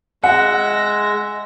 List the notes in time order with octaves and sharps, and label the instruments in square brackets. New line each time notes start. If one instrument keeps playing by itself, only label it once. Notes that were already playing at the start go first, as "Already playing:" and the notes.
[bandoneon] G#3 [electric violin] E5 A#6 [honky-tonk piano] F#5